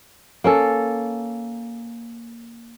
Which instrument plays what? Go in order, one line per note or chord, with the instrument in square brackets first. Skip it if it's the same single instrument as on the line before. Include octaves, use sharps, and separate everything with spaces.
[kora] A#3 C#4 A4